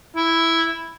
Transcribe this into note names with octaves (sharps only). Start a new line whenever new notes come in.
E4